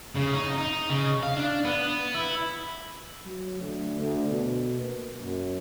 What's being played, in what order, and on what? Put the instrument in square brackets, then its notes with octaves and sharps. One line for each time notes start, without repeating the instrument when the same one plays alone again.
[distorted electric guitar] C#3
D#4
D#4
C#3
F5
D4
B3
E4
[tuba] F#3
D2
D2
B2
A#3
F#2